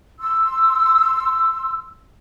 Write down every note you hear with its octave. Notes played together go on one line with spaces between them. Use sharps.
C6 E6